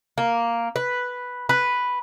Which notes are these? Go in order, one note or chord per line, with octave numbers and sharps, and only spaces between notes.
A#3
B4
B4